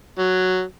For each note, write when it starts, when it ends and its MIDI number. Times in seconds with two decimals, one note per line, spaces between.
0.19 0.64 54